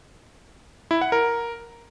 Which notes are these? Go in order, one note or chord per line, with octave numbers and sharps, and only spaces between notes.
E4
F#5
A#4